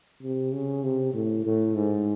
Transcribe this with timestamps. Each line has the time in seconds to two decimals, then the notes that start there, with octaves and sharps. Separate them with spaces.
0.23 C3
0.53 C#3
0.83 C3
1.14 A2
1.44 A2
1.75 G#2